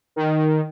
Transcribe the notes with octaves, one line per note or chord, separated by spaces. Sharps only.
D#3